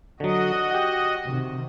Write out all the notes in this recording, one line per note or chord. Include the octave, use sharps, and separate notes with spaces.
D3 F#3 F#4 D#5
G4 F#5
C3 D#3